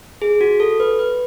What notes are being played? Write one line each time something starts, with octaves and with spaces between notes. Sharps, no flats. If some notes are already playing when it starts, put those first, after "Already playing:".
G#4
F#4
A4
B4
B4